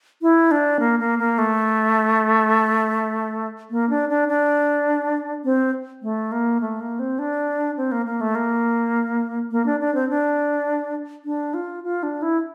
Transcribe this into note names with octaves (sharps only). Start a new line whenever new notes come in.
E4
D4
A#3
A#3
A#3
A3
A#3
D4
D4
D4
C4
A3
A#3
A3
A#3
C4
D4
C4
A#3
A#3
A3
A#3
A#3
D4
D4
C4
D4
D4
F4
F4
D4
E4